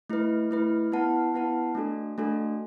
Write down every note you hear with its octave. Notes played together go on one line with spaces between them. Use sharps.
A3 E4 B4
A3 E4 B4
B3 E4 B4 F#5 A5
B3 E4 B4 F#5 A5
A3 D4 F#4 A4
A3 D4 F#4 A4